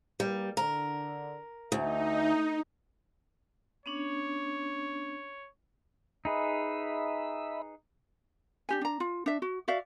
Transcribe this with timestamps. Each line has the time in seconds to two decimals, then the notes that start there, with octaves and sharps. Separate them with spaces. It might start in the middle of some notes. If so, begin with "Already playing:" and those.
0.20 G3 A#3 G4 B4
0.57 D3 A#4
1.72 D2 D#4 E5
3.86 B3 C#4 D4 C#5
6.25 D#4 G#4 B4 D#5 E5 B5
8.69 D4 G4 G#5
8.81 D4 A#5
9.00 F4
9.26 D4 E5
9.42 F#4
9.68 F#4 D5 E5 F5